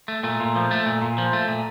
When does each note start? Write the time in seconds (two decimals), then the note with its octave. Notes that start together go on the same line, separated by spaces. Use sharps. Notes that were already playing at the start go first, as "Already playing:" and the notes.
0.08 A3
0.23 A#2 A3
0.40 A#2
0.56 F3
0.71 A3
0.86 A#2
1.02 A#2
1.18 F3
1.33 A3
1.48 A#2